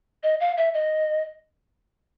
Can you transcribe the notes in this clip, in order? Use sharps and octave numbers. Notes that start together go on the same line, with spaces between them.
D#5
F5
E5
D#5